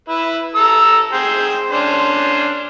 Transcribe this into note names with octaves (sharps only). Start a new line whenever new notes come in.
E4 B4
A4 A#5 E6
G#4 C5 G5
C#4 D4 C5